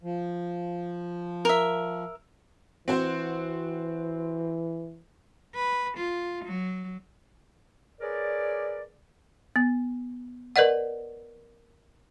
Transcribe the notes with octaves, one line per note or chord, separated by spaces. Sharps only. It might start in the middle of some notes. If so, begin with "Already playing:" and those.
F3
A#4 E5
E3 C4 F#4 C5
B4
F4
F#3
G#4 A#4 B4 C#5 D5
B3
A#4 B4 D5 D#5 F#5